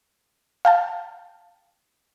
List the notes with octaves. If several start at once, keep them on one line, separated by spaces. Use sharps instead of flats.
F5 G5 A5